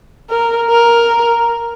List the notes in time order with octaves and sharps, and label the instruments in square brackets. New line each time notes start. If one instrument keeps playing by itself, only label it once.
[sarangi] A#4
A#4